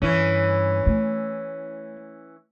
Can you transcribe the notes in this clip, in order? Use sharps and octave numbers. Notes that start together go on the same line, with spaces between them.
G2 E3 C#4
A3